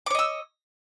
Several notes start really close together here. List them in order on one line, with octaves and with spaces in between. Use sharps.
D6 C#5 D#5 E6